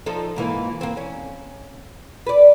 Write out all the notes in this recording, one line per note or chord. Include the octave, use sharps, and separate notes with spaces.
F3 D#4 A4
G#2 E3 A#3
A#3 C4
C#4
B4 D5